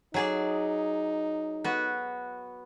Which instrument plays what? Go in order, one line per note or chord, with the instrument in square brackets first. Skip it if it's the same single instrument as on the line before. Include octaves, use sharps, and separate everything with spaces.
[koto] F#3 G#4 D5 [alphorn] D#4
[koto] B3 F#4